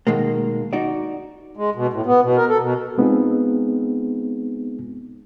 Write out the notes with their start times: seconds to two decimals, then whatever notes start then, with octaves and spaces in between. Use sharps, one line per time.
0.07 B2 D#3 G#3 A#3
0.73 D#4 F#4 D5
1.57 G#3
1.75 B2
1.93 A2
2.06 B3
2.21 B2
2.37 A#4
2.49 A4
2.61 B2
2.98 G#3 B3 C4 D#4 F4 G#4